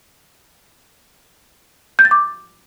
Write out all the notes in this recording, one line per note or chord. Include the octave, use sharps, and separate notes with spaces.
G6
A6
D6